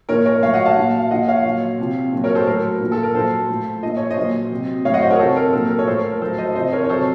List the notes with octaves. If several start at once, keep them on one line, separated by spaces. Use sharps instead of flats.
A#2 F3 A#4 C#5
A#4 C#5
A2 F#3 C#5 F5
D#5 F#5
F5 A5
A#2 F#3
F5
A#2 F3 D#5 F#5
C#5 F5
A#2 F#3
C3 F3
A#2 F#3
A#4 C#5
A4 C5
A2 F#3 A#4
A#2 F3
A4
A#4
A#2 F#3 A4 C5
A2 F3
A#2 F3 D#5
C#5
C5 D#5
A#2 F#3
C3 F#3
A2 F#3 C#5 D#5 F5 F#5
C5 D#5
A#4 C#5
C3 F3 A4 C5
A#4
A#2 F#3 A4
A#4
C#5
A2 F3 A4 C5
A#4
A#4
A2 F#3 A4 C5
C5 D#5
C3 F3 C5 D#5
A#4 C#5
C#5
C3 F#3 A4 C5